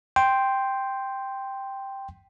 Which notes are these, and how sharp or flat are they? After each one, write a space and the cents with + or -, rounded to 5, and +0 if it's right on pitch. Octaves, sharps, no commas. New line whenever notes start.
G5 +0 C6 +0